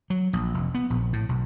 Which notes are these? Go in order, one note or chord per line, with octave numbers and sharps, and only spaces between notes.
F#3
A#1
F1
B3
A#1
A2
B1